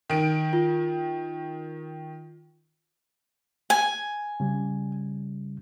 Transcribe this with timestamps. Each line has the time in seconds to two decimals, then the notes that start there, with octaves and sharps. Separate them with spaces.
0.10 D#3 D7
0.53 F4
3.70 G#5
4.40 C#3 G3